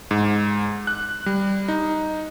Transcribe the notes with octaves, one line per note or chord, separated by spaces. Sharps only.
G#2
F#6
G3
D#4